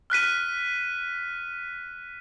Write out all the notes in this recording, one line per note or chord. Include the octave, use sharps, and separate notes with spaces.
F6 F#6 B6 D#7